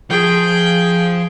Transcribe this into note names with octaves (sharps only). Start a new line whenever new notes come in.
F3 G#4 G5